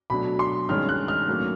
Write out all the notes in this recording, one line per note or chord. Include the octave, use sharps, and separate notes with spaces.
B2 F#3 A3 D4 B5
C6
G2 D#3 G#3 C#4 F6
F#6
F6
A2 F#3 A#3 C#4